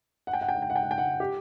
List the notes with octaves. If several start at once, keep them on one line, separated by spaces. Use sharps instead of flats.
F#5
G5
F#5
G5
F#5
G5
F#5
G5
F#5
G5
F#5
G4